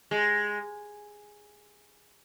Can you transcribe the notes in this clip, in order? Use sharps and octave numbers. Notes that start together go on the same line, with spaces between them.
G#3